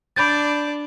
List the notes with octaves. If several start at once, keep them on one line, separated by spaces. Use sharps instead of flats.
D4 D5 B5 G6 A6